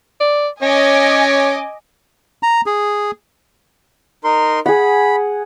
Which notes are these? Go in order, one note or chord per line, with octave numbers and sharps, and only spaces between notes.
D5
C#4 C#5 D#5 G#5 D6
A#5
G#4
D#4 A#4 C6
G#4 F#5 B5